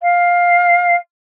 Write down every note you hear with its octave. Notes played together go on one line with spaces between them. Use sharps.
F5